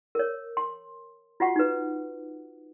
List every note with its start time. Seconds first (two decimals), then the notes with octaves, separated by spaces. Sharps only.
0.15 A#4 C#5
0.57 C6
1.40 F4 F#4 F#5 C#6
1.56 D#4 B4